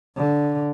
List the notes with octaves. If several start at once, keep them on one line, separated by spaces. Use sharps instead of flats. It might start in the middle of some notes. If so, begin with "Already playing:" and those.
D3